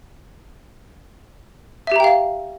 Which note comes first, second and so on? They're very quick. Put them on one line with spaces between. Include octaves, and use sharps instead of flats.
E5 G4 A#5 G5 F5